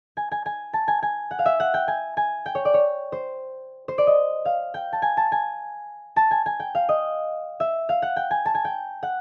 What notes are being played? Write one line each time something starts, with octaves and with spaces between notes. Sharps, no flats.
G#5
G#5
G#5
A5
G#5
G#5
F#5
F5
E5
F#5
G5
G#5
G#5
G5
C#5
D5
C#5
C5
C5
D5
D#5
F5
G5
A5
G#5
A5
G#5
A5
G#5
G#5
G5
F5
D#5
E5
F5
F#5
G5
G#5
A5
G#5
G5
F#5